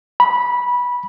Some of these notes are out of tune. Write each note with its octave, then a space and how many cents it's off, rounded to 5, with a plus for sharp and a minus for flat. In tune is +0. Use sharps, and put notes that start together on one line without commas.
B5 -15